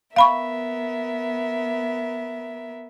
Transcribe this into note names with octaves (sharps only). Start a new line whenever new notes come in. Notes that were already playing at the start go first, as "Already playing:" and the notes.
B3 A#4 E5 F5 B5 C#6